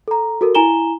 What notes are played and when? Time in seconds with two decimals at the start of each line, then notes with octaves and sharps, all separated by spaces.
0.08 A4 A#5
0.41 F#4 A4 A#4
0.55 E4 G#5 A#5 E7 G7